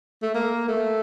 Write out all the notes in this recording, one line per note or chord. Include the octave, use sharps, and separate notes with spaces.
A3
A#3
A3